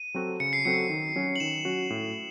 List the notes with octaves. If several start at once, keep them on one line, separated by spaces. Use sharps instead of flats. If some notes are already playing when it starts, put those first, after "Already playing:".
Already playing: D#7
F#3 C4 F#4 A4
C#3 C#7
C7
F#3 C4 F#4 A4 C#7
D#3
F#3 C#4 F#4
F#7
D#3 E7
F#3 C#4 F#4
A2